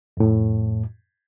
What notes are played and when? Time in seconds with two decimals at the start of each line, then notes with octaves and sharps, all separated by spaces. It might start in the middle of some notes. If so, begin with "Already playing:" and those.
0.17 F2 A2